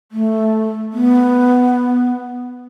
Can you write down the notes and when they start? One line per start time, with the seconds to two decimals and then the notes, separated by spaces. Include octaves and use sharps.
0.12 A3
0.93 B3